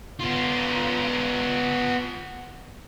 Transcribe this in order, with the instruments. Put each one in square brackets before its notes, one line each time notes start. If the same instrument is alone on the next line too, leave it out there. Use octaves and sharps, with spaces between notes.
[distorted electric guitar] B3 F4